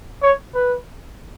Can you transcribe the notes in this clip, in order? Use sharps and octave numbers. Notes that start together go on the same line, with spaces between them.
C#5
B4